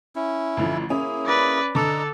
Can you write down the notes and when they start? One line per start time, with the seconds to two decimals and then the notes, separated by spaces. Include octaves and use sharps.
0.16 C#4 E4
0.57 A1 D3 F3
0.90 A#3 C#4 E4 G#4
1.26 B4 D5
1.75 D3 D4 A4 D#5 A#5 D6